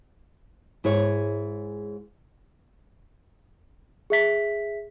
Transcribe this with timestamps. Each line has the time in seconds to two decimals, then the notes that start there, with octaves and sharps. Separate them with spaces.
0.84 G#2 E4 G#4 C#5
4.10 G#4 E5 B6